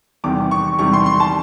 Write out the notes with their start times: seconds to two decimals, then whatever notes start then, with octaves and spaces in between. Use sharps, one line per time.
0.24 E2 C3 D#3 G3 D6
0.51 C#6
0.79 E2 C3 D#3 G3 C#6
0.93 C6
1.06 C6
1.20 A5